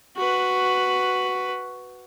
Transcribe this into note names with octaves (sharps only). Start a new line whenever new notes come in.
F#4 B4